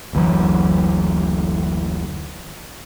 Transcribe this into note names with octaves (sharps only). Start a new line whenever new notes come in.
F#1 D2 E3 F#3